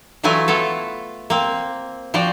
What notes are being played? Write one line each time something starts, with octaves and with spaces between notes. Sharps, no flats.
E3 F#3 A3 E4 F4 G#5
B3 F4 A4
A#3 C4
F3 F#4 C5 D5 G5